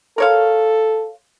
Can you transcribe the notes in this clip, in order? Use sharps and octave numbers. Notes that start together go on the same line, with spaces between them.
A4 A#4 C#5 F5